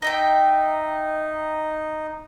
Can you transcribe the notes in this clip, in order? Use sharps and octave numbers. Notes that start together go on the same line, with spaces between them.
D#4 D#5 E5 G5